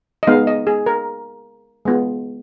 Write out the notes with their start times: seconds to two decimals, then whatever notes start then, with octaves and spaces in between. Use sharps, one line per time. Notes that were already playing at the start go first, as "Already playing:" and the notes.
0.23 D#5
0.27 G#3 B3 D#4 F5
0.47 D#5
0.67 G#4
0.86 A#4
1.85 G#3 B3 F4